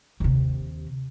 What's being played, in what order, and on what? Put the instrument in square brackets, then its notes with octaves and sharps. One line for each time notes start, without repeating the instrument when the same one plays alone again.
[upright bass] D#2 C3